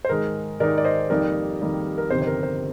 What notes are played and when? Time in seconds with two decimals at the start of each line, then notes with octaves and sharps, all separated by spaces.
0.05 C5
0.09 G#2 D#3 G#3 D#4 A#4
0.60 G#2 D#3 G#3 D#4 A#4 D5
0.78 D5
0.85 C5 D#5
1.10 F2 D#3 G3 A#3 D#4 A#4 D5
1.60 F2 D#3 G3 A#3 D#4
1.98 A#4
2.10 G1 F2 C3 D#3 C5
2.22 C5
2.27 A#4
2.43 C5